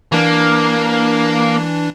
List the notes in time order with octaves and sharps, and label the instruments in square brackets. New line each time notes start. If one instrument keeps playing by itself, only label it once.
[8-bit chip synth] E3 D4 [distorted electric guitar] A#3